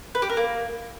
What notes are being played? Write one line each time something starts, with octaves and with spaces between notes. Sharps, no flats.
B4
G4
A#4
A#3